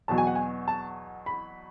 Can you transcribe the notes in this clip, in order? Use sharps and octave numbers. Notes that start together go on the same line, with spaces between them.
E2 B2 F#3 A5
G#5
F#5
G#5
A5
B5